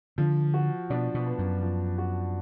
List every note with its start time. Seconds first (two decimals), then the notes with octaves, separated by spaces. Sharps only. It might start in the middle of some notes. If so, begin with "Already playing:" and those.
0.18 D3 F3
0.54 F#4
0.90 B2 D4
1.14 B2
1.26 B3
1.38 F#2
1.63 F3
1.98 F#4